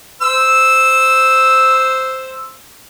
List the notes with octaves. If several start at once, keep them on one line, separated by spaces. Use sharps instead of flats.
C5 E6